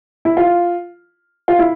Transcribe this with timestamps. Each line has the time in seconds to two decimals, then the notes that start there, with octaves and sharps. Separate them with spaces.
0.25 E4
0.37 F4
1.48 F4
1.59 E4